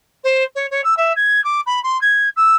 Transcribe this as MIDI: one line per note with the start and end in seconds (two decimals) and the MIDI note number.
0.24 0.43 72
0.55 0.66 73
0.71 0.81 73
0.84 0.97 88
0.97 1.13 76
1.16 1.43 92
1.44 1.61 86
1.66 1.82 83
1.83 2.00 84
2.01 2.29 92
2.36 2.57 88